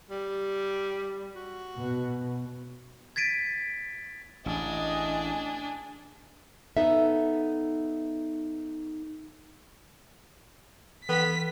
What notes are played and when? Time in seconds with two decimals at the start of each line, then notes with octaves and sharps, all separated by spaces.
0.11 G3
1.35 F#4
1.77 B2
3.16 G#6 A6 B6 D7 D#7
4.46 A1 D4 G#4 D#5
6.77 B3 D#4 A4 E5
11.09 E3 B3 B6